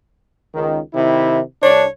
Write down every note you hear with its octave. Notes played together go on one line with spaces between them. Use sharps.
C#2 D#3
C3 D#3 E4
C2 D4 C#5